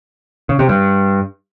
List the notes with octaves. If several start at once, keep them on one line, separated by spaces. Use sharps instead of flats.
C#3
C3
G2